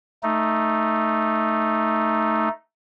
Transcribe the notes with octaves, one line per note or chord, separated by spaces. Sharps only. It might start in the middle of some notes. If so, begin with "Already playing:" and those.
A3 D#4